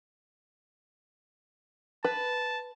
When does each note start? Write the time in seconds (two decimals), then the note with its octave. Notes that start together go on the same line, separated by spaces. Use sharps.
2.04 B4 A5